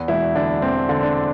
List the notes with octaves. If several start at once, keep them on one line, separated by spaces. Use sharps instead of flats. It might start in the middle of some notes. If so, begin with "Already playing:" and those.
Already playing: E2
E1 E4
D3 D4
E1 C4
D3
D4